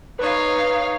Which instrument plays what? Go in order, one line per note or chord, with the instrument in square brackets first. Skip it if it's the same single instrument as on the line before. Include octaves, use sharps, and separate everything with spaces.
[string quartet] D#4 C#5 F5 [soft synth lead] B4